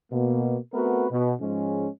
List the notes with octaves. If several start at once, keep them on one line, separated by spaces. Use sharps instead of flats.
B2 A#3
A3 B3 C4 F#4 A#4 B4
B2
G#2 F3 G#3 C#4